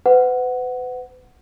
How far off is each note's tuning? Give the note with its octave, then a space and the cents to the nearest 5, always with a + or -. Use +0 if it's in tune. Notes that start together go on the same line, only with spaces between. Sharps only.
B4 +40 F#5 +0